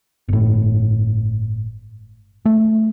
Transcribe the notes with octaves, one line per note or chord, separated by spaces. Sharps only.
G1 A2
A3